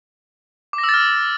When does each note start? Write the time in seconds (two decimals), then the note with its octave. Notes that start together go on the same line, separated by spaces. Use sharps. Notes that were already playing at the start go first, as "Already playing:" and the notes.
0.73 D6
0.78 A#6
0.84 E6
0.89 A6
0.94 F6